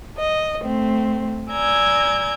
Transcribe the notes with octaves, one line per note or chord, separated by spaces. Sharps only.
D#5
A3 C4
D5 G#5 A#5 E6 G6 G#6